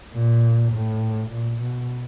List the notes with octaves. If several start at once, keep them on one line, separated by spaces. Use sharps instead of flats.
A#2
A2
A#2
B2